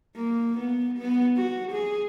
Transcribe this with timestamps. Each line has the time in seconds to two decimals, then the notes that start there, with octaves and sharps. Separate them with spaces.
0.16 A#3
0.59 B3
0.98 B3
1.37 F#4
1.72 G#4